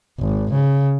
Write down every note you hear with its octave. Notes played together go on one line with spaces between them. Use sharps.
G#1
C#3